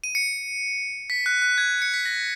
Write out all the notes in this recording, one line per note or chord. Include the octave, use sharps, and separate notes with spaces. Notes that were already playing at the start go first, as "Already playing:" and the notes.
D#7
C#7
B6
F#6
F#6
G#6
C#7
B6
A#6